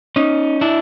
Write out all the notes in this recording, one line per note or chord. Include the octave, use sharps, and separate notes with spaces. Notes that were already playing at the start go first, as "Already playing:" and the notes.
C#4 D#4
D4 E4